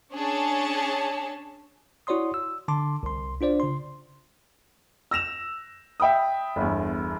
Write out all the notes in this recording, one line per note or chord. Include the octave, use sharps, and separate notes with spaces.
C#4 D4 G#4 C#5 A5
E4 F#4 C#5 D5 C6 D#6
E6
D3 A5 C6 D6
C2 C6
D4 F4 C5 D5
C#3 C6
E6 A#6 E7 F7
E5 G5 B5 D#6
G1 E2